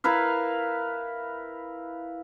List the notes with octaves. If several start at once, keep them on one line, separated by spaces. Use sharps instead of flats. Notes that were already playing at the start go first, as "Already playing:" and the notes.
E4 A#4 B4 F5